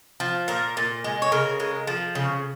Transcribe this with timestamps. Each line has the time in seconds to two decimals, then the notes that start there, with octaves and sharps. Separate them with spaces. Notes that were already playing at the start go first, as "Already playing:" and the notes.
0.20 F3
0.48 A#2 A#4
0.77 A#2
1.04 G#3
1.22 C#5
1.32 C#3 A#4
1.60 G#3
1.87 F3
2.15 C#3